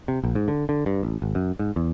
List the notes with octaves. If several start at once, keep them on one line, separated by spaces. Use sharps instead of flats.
C3
A#1
G#2
D3
D3
G2
A1
G#1
F#2
G#2
E2